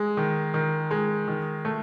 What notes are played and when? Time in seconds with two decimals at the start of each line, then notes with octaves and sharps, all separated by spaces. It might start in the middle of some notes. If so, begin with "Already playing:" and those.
Already playing: G#3
0.17 D#3
0.54 D#3
0.91 G#3
1.28 D#3
1.65 A3